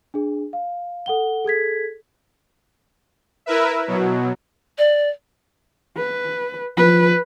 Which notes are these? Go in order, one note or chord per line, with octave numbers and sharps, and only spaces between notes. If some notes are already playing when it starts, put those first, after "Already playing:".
D4 G#4
F5
A4 F#5 G7
G#4 A4 G#6 B6
E4 A#4 B4 E5
B2 F#3
D5
B4
F3 B4